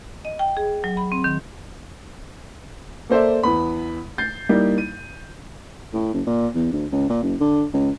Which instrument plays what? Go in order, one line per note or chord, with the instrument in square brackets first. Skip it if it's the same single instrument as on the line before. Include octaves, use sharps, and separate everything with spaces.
[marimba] D#5
G5
G#4
F#3
B5
C4
D#3
[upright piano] A#3 A4 C5 D5 E5
E2 B3 B5
G6 A6 C7
G3 A#3 D#4 E4
D#7
[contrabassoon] A2
F#1
A#2
E2
D2
C#2
A#2
F#1
D3
C#2